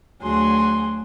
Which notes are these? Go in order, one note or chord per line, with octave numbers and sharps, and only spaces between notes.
D2 F#3 G#4 C6